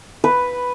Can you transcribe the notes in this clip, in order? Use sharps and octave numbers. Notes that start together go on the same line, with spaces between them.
B4